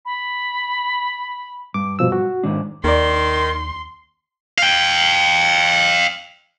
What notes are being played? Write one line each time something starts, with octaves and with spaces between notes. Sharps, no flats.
B5
G2 D6
B2 F3 E6
F#4
G#2 D#3 D4
D#2 D#3 A#4 D5 C6
F5 G5